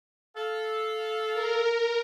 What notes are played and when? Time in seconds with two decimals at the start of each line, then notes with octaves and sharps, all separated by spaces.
0.36 A4 F5
1.34 A#4